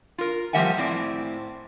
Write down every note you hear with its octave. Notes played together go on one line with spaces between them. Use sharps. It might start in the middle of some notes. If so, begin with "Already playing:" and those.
F4 A#4
F3 G3 A#3 E5 F#5 G#5
A2 C4 D5